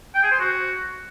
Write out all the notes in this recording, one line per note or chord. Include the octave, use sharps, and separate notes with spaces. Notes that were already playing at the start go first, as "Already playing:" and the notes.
G5
G#4
C5
F#4